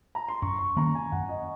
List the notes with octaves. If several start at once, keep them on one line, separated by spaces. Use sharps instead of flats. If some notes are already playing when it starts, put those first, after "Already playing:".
A#5
C6
F#2 C#6
C#6
D#3 A#3 C#4 A#5
G#5
F#2 F#5
D#5